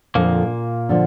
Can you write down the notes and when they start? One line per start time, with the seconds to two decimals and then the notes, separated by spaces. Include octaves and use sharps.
0.15 F2 A#2 D3 F3 A#3
0.89 D3 F3